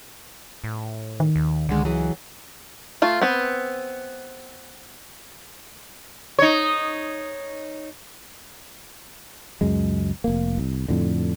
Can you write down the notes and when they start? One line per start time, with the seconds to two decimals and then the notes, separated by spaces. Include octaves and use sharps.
0.64 A2
1.20 D#3
1.36 D#2
1.69 C#2 D3 G#3
1.85 E3 F#3 G#4
3.02 A3 F4
3.21 B3 C4
6.39 D#4 C#5
9.61 C#2 F#2 G#3
10.24 F1 A#3
10.58 C2
10.88 F2 A2 D3